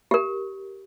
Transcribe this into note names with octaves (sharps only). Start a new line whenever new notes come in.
G4 A#4